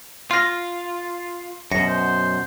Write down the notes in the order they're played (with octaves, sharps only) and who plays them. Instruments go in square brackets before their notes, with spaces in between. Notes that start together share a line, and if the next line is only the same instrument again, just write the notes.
[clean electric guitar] F4 [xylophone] C6 F6 A#6
[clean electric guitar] F#2 B2 [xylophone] A#6 C#7
[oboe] C5